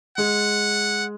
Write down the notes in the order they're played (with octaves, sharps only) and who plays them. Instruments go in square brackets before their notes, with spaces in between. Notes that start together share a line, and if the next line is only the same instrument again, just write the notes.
[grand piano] G#3 [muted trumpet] F#5